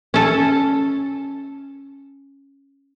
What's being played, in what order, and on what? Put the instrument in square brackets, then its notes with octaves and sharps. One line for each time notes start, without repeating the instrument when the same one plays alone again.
[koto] C#4 A4